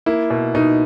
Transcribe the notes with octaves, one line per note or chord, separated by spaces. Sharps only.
A#3 E4
B2
B2 D#4